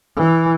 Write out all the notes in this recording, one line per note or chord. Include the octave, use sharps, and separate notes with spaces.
E3